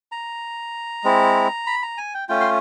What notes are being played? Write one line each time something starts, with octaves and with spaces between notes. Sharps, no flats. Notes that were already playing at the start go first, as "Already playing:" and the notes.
A#5
G#3 C4 E4
B5
A#5
G#5
G5
A3 C#4 F4 G5
C6